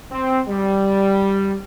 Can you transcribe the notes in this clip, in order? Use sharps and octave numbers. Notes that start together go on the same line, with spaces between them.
C4
G3